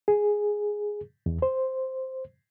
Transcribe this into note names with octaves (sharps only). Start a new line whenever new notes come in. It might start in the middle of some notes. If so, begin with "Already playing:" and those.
G#4
E2
C5